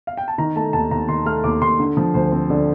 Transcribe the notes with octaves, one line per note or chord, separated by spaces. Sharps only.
F5
G5
A5
D#3 A#5
A3 A5
D#2 A5
D#2 A#5
D#3 C6
A3 F6
D#2 D6
D#2 C6
D3
F3
D2 C5
C4
D3 D5